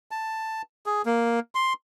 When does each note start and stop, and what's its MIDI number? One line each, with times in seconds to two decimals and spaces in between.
0.11 0.62 81
0.86 1.02 68
1.06 1.40 58
1.55 1.73 84